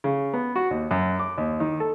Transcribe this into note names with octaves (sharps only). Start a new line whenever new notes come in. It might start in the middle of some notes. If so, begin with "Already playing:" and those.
C#3
B3
F#4
D#2
F#2
D6
D#2
D#3
A4